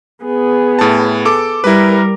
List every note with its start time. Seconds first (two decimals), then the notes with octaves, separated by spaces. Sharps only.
0.25 B3 G#4
0.79 A2 A5
1.25 A4 D6
1.64 G3 E4 A#4 B4